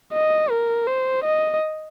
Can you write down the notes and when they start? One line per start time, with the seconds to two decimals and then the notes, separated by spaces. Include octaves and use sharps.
0.13 D#5
0.51 A#4
0.87 C5
1.24 D#5